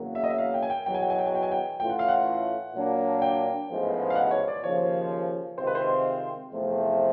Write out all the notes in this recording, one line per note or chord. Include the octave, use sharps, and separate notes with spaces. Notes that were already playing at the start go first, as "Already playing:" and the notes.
Already playing: E2 C#3 F#3 A#3
E5
D#5
E5
F5
G5
G#5
G5
E2 B2 F#3 G5
G#5
G5
G#5
G5
G#5
G5
G#5
G5
A2 E3 A3 C#4 F4 G5
F#5
F5
F#5
A#2 F#3 A#3 D4
G5
A1 G#2 F3 G#3 B3
F5
F#5
C#5
D5
D#2 C#3 F3 C#5
C3 D#3 G#3 C4 F4 C5
B4
C5
E2 C3 F3 A3